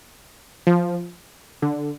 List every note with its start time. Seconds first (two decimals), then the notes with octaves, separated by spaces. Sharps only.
0.67 F3
1.62 D3